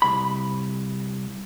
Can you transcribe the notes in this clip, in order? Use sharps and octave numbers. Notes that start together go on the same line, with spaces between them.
C2 B5